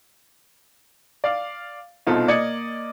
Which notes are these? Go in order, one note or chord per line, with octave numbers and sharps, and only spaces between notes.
D5 F5 D6
C2 B2 D#4 F4 A4 C5
A#3 D5 D#5 G#6 C#7